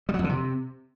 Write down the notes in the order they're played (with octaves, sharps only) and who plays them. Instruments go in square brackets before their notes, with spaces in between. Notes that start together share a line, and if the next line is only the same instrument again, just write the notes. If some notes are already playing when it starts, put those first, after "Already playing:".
[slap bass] G3
F#3
F2
D3
C3